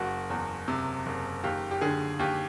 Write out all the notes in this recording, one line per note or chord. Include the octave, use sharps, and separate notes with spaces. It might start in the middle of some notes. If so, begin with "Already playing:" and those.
Already playing: F#1 F#4
E2
C3
F#1
D#2 G4
G4
D3 G#4
D#2 G4